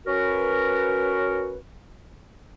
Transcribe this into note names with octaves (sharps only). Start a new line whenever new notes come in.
C#4 F#4 A#4 B4